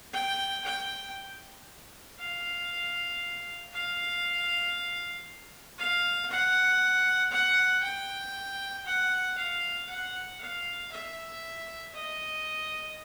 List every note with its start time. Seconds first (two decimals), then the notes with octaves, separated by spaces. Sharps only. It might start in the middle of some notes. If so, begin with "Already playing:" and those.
0.13 G5
0.65 G5
2.19 F5
3.73 F5
5.78 F5
6.30 F#5
7.32 F#5
7.83 G5
8.86 F#5
9.38 F5
9.89 F#5
10.41 F5
10.92 E5
11.95 D#5